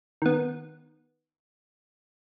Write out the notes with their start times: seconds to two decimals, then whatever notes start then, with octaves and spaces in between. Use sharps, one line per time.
0.22 D#3 B3